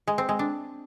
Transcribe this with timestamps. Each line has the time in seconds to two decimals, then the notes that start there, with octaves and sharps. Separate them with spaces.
0.07 G#3
0.18 C4
0.29 G#3
0.39 D4